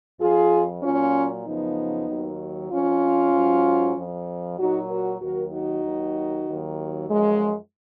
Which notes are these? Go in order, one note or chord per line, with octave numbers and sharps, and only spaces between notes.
F2 F3 F4 G#4
A#2 F#3 C#4 F4
F#2 C#3 F3 B3 D#4
D#2 D#3 F#3
F2 F3 C#4 F4
G#2 F#3
F2 F3
A#2 F#3 D#4 F#4
F#4 A#4
D#2 D#3 F#3 F#4 A#4
D#4 F#4
D#2 D#3 F#3
D#2 D#3 F#3
F#2 F3 G#3